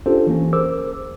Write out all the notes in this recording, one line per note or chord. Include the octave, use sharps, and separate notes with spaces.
C#4 D4 F4 G4 A4 C5
E3 A#3 C#4
G#4 A#4 C5 D6 E6